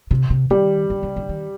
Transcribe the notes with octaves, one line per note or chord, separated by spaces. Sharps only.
C3
C3
D#3 G3
D3
C#3
D3
D#3